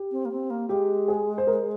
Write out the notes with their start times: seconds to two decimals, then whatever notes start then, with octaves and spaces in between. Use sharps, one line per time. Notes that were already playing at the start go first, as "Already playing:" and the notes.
Already playing: G4
0.11 C4
0.25 A#3
0.31 C4
0.50 A#3
0.69 G#3 G4
1.08 G#4
1.38 C5
1.47 A#4